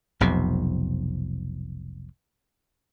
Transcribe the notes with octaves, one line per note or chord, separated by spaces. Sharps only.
F1 B1 F2 C3